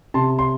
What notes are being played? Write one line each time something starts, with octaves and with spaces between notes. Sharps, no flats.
C3 A5 C6
C6